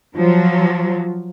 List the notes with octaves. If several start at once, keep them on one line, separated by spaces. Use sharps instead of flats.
F3 F#3